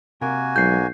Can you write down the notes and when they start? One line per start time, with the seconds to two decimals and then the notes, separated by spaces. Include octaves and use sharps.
0.21 C3 A#3 F#4 A#4 G#5
0.56 B1 F#3 G#3 G6 C7